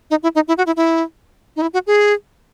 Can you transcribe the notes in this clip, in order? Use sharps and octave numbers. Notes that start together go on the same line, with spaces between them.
D#4
E4
D#4
E4
F#4
E4
E4
D#4
E4
F#4
G#4